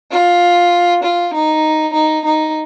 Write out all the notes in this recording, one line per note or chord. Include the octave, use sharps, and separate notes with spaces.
F4
F4
D#4
D#4
D#4